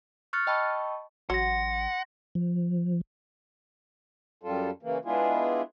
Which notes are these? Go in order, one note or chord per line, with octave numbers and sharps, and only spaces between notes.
C#6 F6 F#6 A6 C#7
D#5 G5 A5 B5 C#6 E6
A1 F#3 F#5 C6 A#6
F3
F#2 G3 F4 A4
C#3 E3 A#3
G#3 B3 D4 E4 F4 G#4